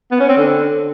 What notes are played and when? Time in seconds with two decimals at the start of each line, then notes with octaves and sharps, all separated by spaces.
0.11 B3
0.20 C#4
0.29 C4
0.37 D3